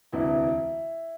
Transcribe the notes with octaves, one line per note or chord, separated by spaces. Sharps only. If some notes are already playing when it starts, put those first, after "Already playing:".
E1 D2 C3 E3 E4